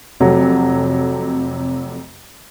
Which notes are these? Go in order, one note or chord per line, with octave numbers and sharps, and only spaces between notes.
F2 C3 F#3 A3